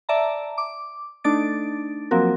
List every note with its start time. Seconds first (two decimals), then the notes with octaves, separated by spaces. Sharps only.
0.09 D5 E5 A5 A#5
0.58 D6
1.24 A3 D4 D#4 A6 D7
2.11 F3 F#3 A#3 C4 F#4 A#4